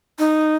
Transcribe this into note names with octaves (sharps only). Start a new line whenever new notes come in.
D#4